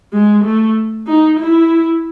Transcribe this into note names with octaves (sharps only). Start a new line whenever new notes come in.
G#3
A3
D#4
E4